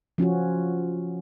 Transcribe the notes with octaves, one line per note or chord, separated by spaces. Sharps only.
F3 C#4 F4 F#4